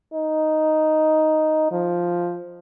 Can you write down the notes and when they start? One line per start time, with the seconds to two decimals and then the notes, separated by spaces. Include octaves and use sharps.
0.14 D#4
1.71 F3